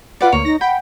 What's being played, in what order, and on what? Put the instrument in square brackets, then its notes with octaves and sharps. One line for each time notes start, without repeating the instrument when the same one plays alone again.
[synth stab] F4 B4 D6 [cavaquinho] D5 F#5
[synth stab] D2 A#3 [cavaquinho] C#5
[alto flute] D#4 [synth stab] A#6
[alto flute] F#5 [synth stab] G5 [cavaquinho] B5